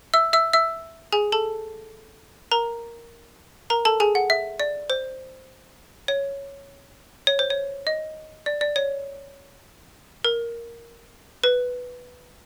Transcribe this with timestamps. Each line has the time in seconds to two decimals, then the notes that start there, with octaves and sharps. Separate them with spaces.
0.14 E5 E6
0.33 E5 E6
0.53 E5 E6
1.12 G#4 G#5
1.32 A4 A5
2.51 A#4 A#5
3.70 A#4 A#5
3.85 A4 A5
4.00 G#4 G#5
4.15 F#5
4.30 E5
4.60 D5
4.90 C5
6.08 C#5
7.27 C#5
7.39 C5
7.50 C#5
7.87 D#5
8.46 D5
8.61 D5
8.76 C#5
10.24 A#4
11.44 B4